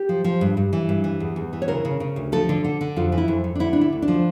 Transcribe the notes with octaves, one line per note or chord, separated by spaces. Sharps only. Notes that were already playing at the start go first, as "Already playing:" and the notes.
Already playing: G4
F3
F3
G2
G2
E3
G2
E3
E2
E2
E3
C#5
C#3 A#4
C#3
C#3
D2
F3 A4
D3
D3
D3
F2 F4
E3
E4
F2
F2
D4
D3 E4
D4
D2 E4
D2
D4
F3